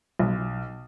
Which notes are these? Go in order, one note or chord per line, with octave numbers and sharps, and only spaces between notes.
B1